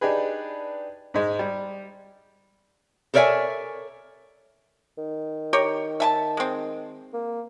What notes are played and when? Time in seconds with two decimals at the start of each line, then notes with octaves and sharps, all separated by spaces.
0.01 D4 D#4 G4 G#4 B4
1.14 G#2 G#3
1.39 G3
3.14 A4 A#4 C#5 D5 E5 G#5
4.98 D#3
5.53 G4 A#4 C#5
6.00 E5 G#5 A5
6.37 G#3 C4
7.14 A#3